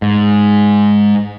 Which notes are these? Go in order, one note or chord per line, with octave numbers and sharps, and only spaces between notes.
G#2